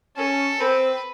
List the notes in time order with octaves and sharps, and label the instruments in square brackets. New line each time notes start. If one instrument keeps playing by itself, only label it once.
[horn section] C#4 [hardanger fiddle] A4
[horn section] C4 [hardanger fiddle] B4